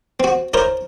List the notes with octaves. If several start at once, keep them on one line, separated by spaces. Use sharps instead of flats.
C4 F#4
E4 A#4 C5 C#5